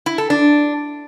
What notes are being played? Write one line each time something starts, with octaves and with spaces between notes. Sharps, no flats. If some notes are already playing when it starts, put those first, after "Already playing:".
E4
A4
D4